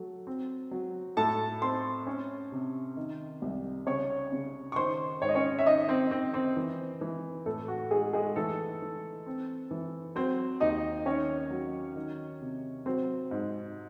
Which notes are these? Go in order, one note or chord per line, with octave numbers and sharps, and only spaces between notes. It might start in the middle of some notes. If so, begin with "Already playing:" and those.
Already playing: F#3 A3
C4
F#3
A2 A4 A5
C4 C5 C6
C#4
C3
D#3
C2
C#3 C#5 C#6
C#3
C#6
D#3 C5 C6
G#2 C#5
D#5
C#4 C#5
E5
D#3 D#4 D#5
C4 C5
D#3 C4 C5
C4 C5
E3
E3
A2 A3 A4
F#4
G#3 D#4 G#4
G#3 G#4
E3 A3 A4
E3
C4
E3
F#3 C4 C5
D#2 D#4 D#5
D#3 C#4 C#5
F#3
D#3
C3
F#3 C4 C5
G#2